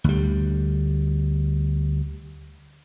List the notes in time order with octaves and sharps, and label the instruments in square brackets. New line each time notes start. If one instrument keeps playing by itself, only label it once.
[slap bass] D2 G3